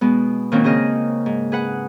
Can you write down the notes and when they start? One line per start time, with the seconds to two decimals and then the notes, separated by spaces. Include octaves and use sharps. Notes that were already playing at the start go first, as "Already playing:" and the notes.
0.01 B2 G#3 B3
0.52 A#2 D#3 A#3 C4 C#4 F#4
0.64 C#3 C4 G#4 D#5 F6
1.26 G#2
1.52 G#4 B4 F#5